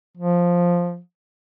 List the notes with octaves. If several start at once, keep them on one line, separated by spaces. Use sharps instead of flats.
F3